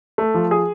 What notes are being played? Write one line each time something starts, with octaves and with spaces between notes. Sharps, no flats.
A3
F3
G#4